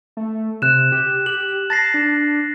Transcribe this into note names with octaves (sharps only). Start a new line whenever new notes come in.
A3
C3 F#6 E7
G4
G4 F#7
A5 A6 A#6 C7
D4